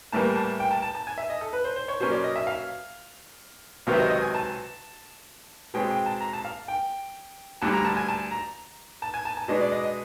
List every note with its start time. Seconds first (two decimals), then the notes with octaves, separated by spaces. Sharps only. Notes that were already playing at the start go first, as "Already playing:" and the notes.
0.12 A2 E3 G3 A#3 A5
0.36 A5
0.60 G5
0.71 A5
0.82 A5
0.95 A5
1.07 G#5
1.18 E5
1.30 D#5
1.41 A4
1.53 B4
1.64 C5
1.76 C5
1.88 C#5
2.00 B2 F#3 A#3 C#4 C5
2.11 D5
2.24 D#5
2.36 E5
2.47 F5
3.87 C#2 C3 D#3 F#3 B3 F5
3.94 E5
3.99 D#5
4.10 D#5
4.22 G#5
4.34 A5
5.74 B2 G#3 C4 G5
5.90 G5
6.06 A5
6.21 A#5
6.33 A5
6.45 F5
6.68 G5
7.62 D2 D3 G3 A5
7.73 A#5
7.85 A5
7.97 G#5
8.09 A5
8.31 A#5
9.02 A5
9.14 G#5
9.25 A5
9.37 A5
9.48 B2 G#3 B3 D4 D#5
9.61 D5
9.72 D#5
9.84 D#5